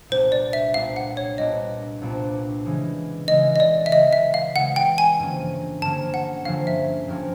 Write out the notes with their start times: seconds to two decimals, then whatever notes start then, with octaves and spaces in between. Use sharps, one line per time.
0.09 C2 A#2 G3 B3 D4 C5
0.32 D5
0.53 E5
0.74 C2 A#2 G3 B3 D4 F5
0.96 F#5
1.17 C#5
1.38 C2 A#2 G3 B3 D4 D#5
2.02 C2 A#2 G3 B3 D4
2.65 C#3 E3 G#3
3.28 C#3 E3 G#3 D#5
3.56 D#5
3.60 D5
3.86 E5
3.92 C#3 E3 G#3 D#5
4.13 E5
4.34 F5
4.56 C#3 E3 G#3 F#5
4.76 G5
4.98 G#5
5.19 G2 D3 F3 A#3 C#4
5.82 G2 D3 F3 A#3 C#4 A5
6.14 F#5
6.45 G2 D3 F3 A#3 C#4 F5
6.67 E5
7.08 G2 D3 F3 A#3 C#4